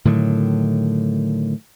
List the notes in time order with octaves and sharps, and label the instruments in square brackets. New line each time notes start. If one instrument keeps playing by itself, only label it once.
[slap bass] A2 D3 D#3 F#3